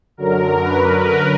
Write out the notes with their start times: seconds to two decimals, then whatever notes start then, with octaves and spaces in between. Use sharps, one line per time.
0.17 F#2 D3 F#3 A#4
0.62 B4
1.05 A#4